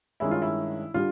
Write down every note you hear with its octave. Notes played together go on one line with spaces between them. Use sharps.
G2 D#3 G#3 C#4 E4
F4
E4
D3 G3 F4